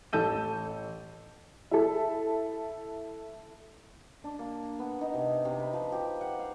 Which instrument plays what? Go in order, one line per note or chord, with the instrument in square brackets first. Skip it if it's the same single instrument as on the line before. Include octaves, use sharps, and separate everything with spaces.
[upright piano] A1 A4 A5 G6 D#7
[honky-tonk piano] E4 A4
[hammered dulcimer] D4
A#3
B3
D#4
C3
C3
B4
F3
G4
F#5
F5